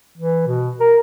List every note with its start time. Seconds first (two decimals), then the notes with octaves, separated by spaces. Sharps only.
0.18 E3
0.47 B2
0.80 A#4